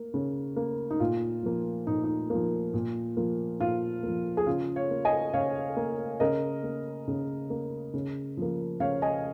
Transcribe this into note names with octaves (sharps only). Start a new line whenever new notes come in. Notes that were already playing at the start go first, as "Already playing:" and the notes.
Already playing: A#3
C#3
A#3
D#4
A#2 F4
F3 A#3
A#2 D#4
D#4
F3 A#3
A#2
F3 A#3
A#2 F4
F3 A#3
G#4
C#3 F4
C#5 F5
A#3
D#5 G#5
C#3 C#5 F5
A#3
C#3 A#4 D#5
A#3
C#3
A#3
C#3
F3 A#3
C#3 C#5 F5
D#5 G#5